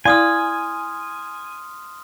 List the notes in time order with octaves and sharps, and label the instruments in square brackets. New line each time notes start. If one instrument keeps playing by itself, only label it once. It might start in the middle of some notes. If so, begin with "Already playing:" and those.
[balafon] E4 D5 F5 [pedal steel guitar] G#5 [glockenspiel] C6 D#6 F6